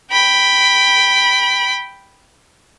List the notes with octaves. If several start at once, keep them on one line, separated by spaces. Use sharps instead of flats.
G5 B5